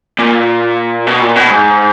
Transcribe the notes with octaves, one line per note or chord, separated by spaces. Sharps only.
A#2
B2
A#2
B2
G#2